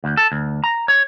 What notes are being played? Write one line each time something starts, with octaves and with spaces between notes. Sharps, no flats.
D2
A4
D2
A#5
C#5